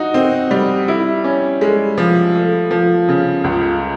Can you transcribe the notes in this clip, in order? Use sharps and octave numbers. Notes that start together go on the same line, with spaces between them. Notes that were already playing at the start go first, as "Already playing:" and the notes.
Already playing: D#4 F#4
C4
G3
E4
C#4
G#3
F3
A3
F3
C#3
C#2